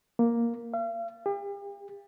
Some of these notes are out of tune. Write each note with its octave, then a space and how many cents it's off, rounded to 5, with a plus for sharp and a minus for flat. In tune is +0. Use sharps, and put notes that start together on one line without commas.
A#3 +5
F5 -40
G4 +40